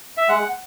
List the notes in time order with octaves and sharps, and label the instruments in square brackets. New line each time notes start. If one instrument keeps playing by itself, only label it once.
[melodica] E5
G#3 F#5